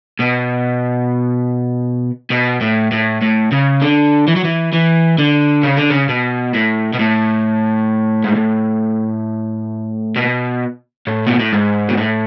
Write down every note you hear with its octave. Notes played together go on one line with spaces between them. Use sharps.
B2
B2
A2
A2
A2
C#3
D3
E3
F#3
E3
E3
D3
C#3
D3
C#3
B2
A2
B2
A2
G#2
A2
B2
A2
B2
A2
G#2
B2
A2